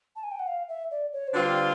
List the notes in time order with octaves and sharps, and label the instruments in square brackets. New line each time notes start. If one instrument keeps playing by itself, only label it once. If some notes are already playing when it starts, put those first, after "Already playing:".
[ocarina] A5
G#5
G5
F#5
F5
E5
D5
C#5
C5
[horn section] D3 G3 C4 F4 [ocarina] B4